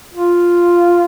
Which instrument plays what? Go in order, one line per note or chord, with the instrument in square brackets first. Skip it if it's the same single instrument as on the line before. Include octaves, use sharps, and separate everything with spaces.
[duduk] F4